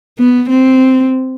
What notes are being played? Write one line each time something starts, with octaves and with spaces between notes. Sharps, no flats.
B3
C4